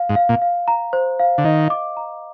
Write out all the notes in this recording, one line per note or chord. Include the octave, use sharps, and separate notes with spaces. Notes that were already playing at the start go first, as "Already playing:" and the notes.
Already playing: F5
G#2
F5
A#2
F5
A#5
C5
F5
D3
D#3 D#5
D6
A#5